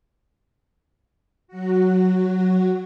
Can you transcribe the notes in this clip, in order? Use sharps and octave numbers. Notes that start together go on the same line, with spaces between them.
F#3 F#4